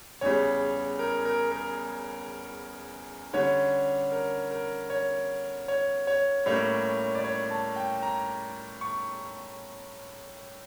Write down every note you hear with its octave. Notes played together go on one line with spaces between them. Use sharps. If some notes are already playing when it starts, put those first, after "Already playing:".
E2 C#3 G3 C#5
A#4
A#4
A#4
D3 G3 C#4 C#5
A#4
A#4
C#5
C#5
C#5
A2 G3 A#3 C#4 C#5
D5
C#5
A5
G5
A#5
C#6